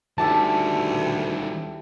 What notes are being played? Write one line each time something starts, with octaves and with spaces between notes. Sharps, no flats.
D2 D#3 G3 E4 G4 A4 A5